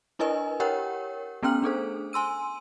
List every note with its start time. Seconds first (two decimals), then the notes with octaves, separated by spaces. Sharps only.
0.19 D4 E4 A#4 B4 D#5 G#5
0.60 G4 A#4 C#5 F#5 G5
1.43 A3 B3 C#4 G5 F6 F#7
1.62 D4 G#4 A4 C5
2.13 G#5 C6 E6 D#7